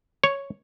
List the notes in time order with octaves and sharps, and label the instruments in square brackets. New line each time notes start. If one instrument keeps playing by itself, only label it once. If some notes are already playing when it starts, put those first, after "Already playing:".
[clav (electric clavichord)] C#5